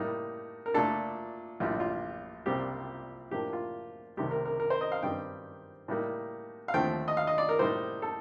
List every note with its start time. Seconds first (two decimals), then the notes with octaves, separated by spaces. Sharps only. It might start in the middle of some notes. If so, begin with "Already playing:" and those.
Already playing: A2 G3 A#3 D#4
0.66 A#4
0.74 A#2 A3 D4 A4
1.60 A#1 A2 G3 F4
1.80 F4
2.46 C2 A#2 G3 C4 G4
3.31 A2 F3 A#3 D4 G4
3.53 F4
4.17 C2 C3 D#3 A3 G4
4.31 A#4
4.45 A#4
4.60 A#4
4.70 C5
4.81 D#5
4.92 F5
5.03 G2 D#3 G3 C4 D#4 G5
5.88 A2 G3 A#3 D#4
6.68 F5
6.74 D#2 D3 F3 A3 C4 G5
7.08 D#5
7.17 F5
7.27 D#5
7.38 D5
7.49 A#4
7.59 A2 G3 A#3 D#4 C5
8.02 A4